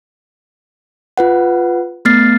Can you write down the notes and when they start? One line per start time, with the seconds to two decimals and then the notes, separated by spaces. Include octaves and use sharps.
1.17 F4 B4 F#5
2.05 A3 B3 F6 A6 C7